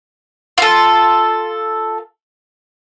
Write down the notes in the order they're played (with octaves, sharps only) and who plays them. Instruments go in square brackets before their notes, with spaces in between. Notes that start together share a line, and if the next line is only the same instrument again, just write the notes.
[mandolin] F4 A4